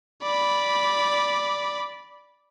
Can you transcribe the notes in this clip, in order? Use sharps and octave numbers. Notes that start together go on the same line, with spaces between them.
D5 B5